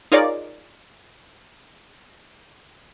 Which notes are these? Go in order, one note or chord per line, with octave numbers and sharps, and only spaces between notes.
D#4 F4 G#4 A#4 C#5 D5